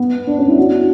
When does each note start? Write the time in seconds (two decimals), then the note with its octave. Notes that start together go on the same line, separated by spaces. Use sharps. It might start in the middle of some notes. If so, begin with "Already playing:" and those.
Already playing: B3
0.27 D4
0.38 C#4
0.48 E4
0.58 F#4